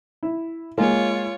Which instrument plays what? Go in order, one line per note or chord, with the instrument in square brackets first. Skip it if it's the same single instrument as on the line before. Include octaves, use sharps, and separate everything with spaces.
[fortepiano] E4
[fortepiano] G#3 A#3 [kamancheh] F4 C#5